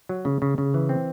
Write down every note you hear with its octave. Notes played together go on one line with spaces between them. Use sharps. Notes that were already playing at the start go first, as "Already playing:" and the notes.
F#3
C#3
C#3
C#3
E3
C4